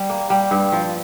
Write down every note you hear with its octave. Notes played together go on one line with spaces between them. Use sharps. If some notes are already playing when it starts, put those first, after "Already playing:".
Already playing: G3
A#3
G3
G2
F3